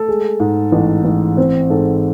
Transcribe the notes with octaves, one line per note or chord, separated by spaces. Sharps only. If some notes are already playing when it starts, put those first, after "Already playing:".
Already playing: A3 A4
G#3
G#2
A1
A1
C4 C5
G#2 A4